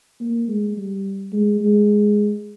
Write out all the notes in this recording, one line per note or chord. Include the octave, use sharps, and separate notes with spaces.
A#3
G#3
G3
G#3
G#3